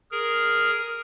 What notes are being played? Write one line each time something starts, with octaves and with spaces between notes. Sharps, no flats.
G#4 A#4 F6